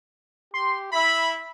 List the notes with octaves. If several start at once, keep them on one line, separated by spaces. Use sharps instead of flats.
G4 C6
E4 E5 B5 B6